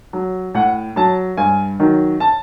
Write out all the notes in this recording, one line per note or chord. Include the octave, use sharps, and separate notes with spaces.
F#3
A2 F#5
F#3 A5
G2 G#5
D#3 F#3
A5